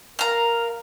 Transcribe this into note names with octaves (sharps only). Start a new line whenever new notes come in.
A#4 F5 A#5